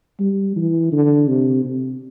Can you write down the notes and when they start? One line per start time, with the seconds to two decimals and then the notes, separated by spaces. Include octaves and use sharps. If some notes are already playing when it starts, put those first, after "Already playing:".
0.19 G3
0.56 E3
0.92 D3
1.28 C3
1.64 C3